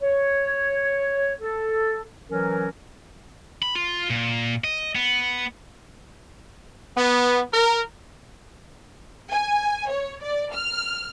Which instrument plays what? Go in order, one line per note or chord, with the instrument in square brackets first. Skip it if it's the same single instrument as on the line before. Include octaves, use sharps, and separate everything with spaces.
[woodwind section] C#5
A4
E3 F#3 C#4 A#4
[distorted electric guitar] B5
F4
A#2
D#5
B3
[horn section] B3
A#4
[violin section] G#5
C#5
D5
F6